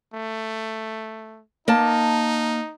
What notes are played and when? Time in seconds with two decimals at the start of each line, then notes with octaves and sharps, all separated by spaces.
0.14 A3
1.68 A#3 D#4 A5